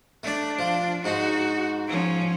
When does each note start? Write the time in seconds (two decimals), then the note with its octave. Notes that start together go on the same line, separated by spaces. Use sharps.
0.23 A3 D4 D5
0.59 F3
1.04 G#2 D#4 F#4
1.87 F3 C#4